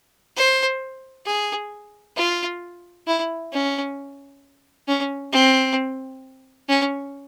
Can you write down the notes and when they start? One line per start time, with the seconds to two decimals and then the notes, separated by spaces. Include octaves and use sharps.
0.37 C5
1.26 G#4
2.17 F4
3.07 E4
3.53 C#4
4.88 C#4
5.33 C4
6.69 C#4